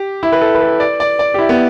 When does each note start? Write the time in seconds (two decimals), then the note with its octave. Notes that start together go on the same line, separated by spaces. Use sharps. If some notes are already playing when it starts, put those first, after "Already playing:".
Already playing: G4
0.23 E4
0.32 B4
0.41 A4
0.55 B4
0.61 A4
0.80 D5
1.00 D5
1.19 D5
1.34 G4
1.39 E4
1.49 B3